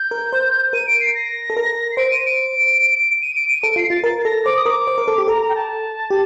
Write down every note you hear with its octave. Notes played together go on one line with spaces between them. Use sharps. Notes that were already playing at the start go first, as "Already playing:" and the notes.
Already playing: G6
A#4
C5
A#4 D#7
D7
C7
A#6
A4
A#4
C7
C5 D7
D#7
D7
D#7
D7
D#7
A4 D7
F4 C7
F4 A6
A#4 A6
A6
A4 A#6
C5 D6
D#6
A#4 D6
C5
A#4
A4
G4
A4 A#5
A#5
G5
A5
G4